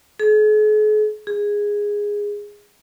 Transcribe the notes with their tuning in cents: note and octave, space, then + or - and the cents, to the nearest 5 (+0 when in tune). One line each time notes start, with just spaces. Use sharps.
G#4 +45
G#4 -10